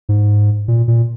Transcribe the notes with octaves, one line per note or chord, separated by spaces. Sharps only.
G#2
A#2
A#2